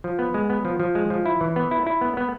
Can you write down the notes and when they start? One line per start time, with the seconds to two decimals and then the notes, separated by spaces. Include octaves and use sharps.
0.04 F3
0.19 B3
0.34 G#3
0.50 B3
0.65 F3
0.80 F3
0.95 G#3
1.10 F3
1.26 E4
1.41 E3
1.56 B3
1.71 E4
1.86 E4
2.01 B3
2.17 B3